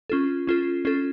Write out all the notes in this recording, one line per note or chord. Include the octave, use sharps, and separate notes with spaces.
C#4 F4 A4
C#4 F4 A4
C#4 F4 A4